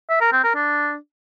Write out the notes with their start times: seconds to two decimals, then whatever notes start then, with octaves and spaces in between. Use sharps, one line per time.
0.09 E5
0.21 A#4
0.32 C4
0.44 A#4
0.55 D4